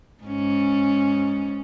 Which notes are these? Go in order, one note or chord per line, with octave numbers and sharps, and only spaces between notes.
G#2 C#4